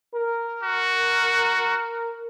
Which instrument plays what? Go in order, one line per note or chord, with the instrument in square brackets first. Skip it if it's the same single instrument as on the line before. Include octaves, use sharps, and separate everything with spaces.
[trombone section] A#4
[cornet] F#4